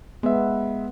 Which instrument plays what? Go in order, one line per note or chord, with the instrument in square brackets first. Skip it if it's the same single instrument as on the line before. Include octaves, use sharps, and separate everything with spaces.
[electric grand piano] G#3 E5 [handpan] B3